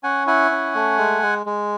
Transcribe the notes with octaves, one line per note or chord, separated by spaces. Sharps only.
C#4 F#5 G#5
E4 F#5 G#5
C#4
A3
G#3
G#3
G#3